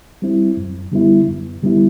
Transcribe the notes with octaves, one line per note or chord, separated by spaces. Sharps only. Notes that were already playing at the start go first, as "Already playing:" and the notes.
G3 C4 E4
F#2
D3 G3 B3 E4
F#2
D3 G3 B3 E4